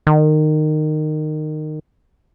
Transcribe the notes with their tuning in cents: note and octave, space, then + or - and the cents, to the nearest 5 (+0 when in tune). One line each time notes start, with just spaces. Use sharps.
D#3 -20